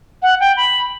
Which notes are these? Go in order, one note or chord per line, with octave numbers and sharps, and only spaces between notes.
F#5
G5
B5